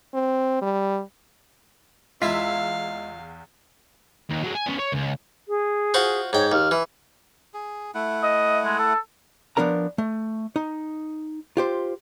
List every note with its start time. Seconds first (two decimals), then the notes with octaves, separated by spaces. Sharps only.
0.14 C4
0.62 G3
2.22 E2 G#3 E4 F4 F5 E6 B6
4.29 D#2
4.43 F#3 G#3
4.55 G#5
4.66 B3 C#4
4.79 C#5
4.92 C#2
5.48 G#4
5.94 F4 F#4 C5
6.33 G#2 C#5 G5
6.52 D#2 F6
6.71 E3
7.54 G#4
7.94 A3 E4 F#5
8.23 D#5
8.65 G#3
8.79 A4
9.57 F3 B3 D4 A#4 A#5
9.98 A3
10.56 D#4
11.57 F4 G4 C5